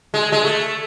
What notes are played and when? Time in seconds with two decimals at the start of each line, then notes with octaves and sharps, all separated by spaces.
0.14 G#3
0.32 G#3
0.44 A3